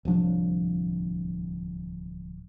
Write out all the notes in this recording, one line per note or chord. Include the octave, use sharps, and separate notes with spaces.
D1 C2 F3 D4